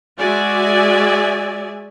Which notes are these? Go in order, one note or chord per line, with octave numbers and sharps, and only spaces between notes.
G#3 F#4 D5 E5 G#5